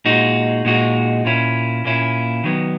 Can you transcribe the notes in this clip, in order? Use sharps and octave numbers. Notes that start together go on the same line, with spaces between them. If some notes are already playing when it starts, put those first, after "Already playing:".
A#2 G#3 D#4 F#4
A#2 G#3 D#4 F#4
A#2 A#3 C#4 E4
A#2 A#3 C#4 E4
D#3 F#3 B3